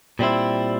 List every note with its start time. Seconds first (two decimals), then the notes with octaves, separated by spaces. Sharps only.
0.19 A#2 G3 C4 E4